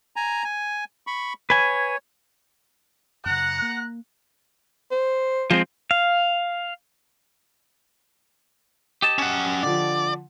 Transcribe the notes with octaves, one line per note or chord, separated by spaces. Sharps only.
G#5 A#5
G#5
B5 C#6
B4 C#5 G#5
F#2 C#3 F#5 A#5 F#6
A#3
C5
F3 G#3 C4
F5
G4 D#5 A5
C#4 F#5
D3 F3 D5